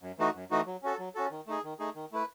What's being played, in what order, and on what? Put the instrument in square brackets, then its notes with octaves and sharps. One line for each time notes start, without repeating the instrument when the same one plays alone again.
[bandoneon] F#2
E3 A3 D#4 F#4
F#2
E3 A3 D#4 F#4
F#3
C#4 F#4 A4
F#3
C#4 F#4 A4
D#3
A3 D#4 G#4
D#3
A3 D#4 G#4
D#3
A3 E4 B4